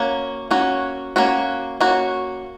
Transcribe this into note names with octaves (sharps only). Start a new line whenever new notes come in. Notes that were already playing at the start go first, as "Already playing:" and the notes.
Already playing: A#3 C#4 F#4
A#3 C#4 F#4
A#3 C#4 F#4
A#3 C#4 F#4